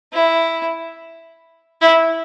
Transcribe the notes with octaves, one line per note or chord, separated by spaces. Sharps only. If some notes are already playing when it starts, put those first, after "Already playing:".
E4
E4